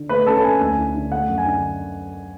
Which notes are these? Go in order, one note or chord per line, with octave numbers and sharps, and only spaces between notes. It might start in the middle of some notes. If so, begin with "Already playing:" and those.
Already playing: D3
A3 B4 B5
C#4 A4 A5
A5
C#4 G#5
D2 G#5
E4
D3
A3 F#5
F#2
G#5
D3